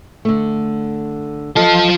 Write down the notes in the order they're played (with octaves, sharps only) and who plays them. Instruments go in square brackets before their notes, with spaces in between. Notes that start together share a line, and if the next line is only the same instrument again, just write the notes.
[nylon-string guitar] D3 A3
[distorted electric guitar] F4 A5 [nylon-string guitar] A4 D#5